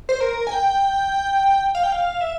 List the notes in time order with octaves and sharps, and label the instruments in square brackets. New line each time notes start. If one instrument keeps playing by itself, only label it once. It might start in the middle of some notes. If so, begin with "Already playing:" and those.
[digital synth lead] C5
A#4
G#5
G5
F5
G5
F5
E5